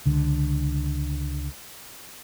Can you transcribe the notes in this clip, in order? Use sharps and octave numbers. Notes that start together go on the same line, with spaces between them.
C#2 D3